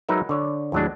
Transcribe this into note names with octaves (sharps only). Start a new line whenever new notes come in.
F#3 G#3 D#4 A#4 B4 E5
D3 C#5 D5
D#2 A2 F#3 G#3 D4